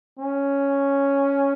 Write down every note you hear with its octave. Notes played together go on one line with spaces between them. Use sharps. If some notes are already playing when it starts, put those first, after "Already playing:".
C#4